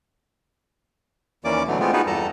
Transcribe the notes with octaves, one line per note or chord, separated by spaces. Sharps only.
D#2 E3 A#3 C#4 D5 D6
B2 D3 E3 F#3 A3
G#3 A3 B3 C4 F4
B3 D#4 F4 F#4 G#4 B4
E2 G2 G3 A4 A5 A#5